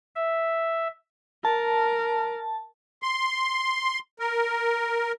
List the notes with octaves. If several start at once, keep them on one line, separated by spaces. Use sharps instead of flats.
E5
A#4 A5
C6
A#4